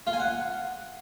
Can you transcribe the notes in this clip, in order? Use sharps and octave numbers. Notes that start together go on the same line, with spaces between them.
F4
G#5
F#5